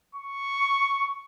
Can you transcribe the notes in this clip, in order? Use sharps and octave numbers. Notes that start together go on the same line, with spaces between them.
C#6